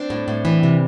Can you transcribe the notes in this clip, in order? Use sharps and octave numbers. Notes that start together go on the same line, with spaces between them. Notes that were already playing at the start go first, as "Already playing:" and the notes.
Already playing: C4 D4
A2
A2
E3
C3